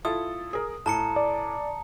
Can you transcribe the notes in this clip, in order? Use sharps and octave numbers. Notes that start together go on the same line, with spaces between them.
E4 F4 A4 D#6
G#4 A#4
A2 A5 A#5 C#7
D5